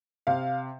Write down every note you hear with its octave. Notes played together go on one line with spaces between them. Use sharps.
C3 F5